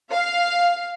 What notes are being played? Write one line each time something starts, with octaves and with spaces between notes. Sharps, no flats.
F5